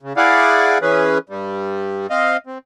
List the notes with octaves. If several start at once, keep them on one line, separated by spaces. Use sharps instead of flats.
C#3
E4 G#4 D5 F5 F#5
E3 C#4 G#4 B4
G2 G3
C4 D#5 F5
C4